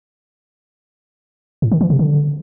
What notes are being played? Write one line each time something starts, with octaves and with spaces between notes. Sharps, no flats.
A2
D#3
E3
C3
D3